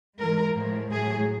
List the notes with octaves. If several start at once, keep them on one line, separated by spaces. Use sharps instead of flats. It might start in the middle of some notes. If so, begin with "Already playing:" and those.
G#2 E3 G#3 A#4
A2 F3 G#3
A2 F#3 G#4